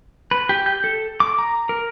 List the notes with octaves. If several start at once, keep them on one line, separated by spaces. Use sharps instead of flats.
B4
G4
G6
A4
D6
A#5
A#4